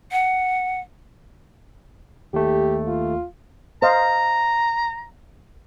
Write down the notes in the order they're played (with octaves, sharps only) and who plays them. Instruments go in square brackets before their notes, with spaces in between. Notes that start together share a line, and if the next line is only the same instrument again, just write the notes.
[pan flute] F#5
[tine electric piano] D#2 A3 [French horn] G4
[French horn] F4
[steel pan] C5 D#5 F5 [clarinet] A#5